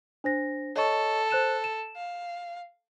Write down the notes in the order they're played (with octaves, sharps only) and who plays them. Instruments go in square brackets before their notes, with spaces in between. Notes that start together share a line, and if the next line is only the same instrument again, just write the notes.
[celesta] D4 C5 A#6
[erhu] A4 [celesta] C#5 D#5 C#6
[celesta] C5 F#6 E7
E7
[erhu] F5